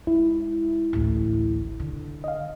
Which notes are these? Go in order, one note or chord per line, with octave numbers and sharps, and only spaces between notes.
G#3 E4
A1 D2
D3
D#5 F5